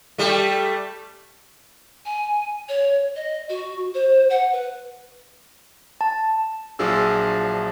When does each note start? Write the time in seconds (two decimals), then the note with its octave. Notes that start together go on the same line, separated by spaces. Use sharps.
0.18 G3 A3
2.05 G#5
2.69 C#5
3.16 D#5
3.49 F#4
3.95 C5
4.30 F#5
4.53 B4
6.01 A5
6.79 A#1 F3 F#3 D4 G#4 E6